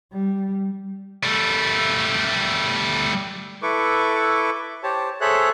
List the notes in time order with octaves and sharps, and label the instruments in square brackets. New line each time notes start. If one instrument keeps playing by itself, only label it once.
[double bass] G3
[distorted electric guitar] G3 A3
[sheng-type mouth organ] E4 A4 B4 C#6 D6
G4 C5 C#5 A5
G#4 A4 C5 C#5 E5 F#6